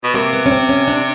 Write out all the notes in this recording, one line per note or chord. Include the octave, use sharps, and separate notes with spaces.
B2
C3 A#3
B3
C#4
C4
C#4
D4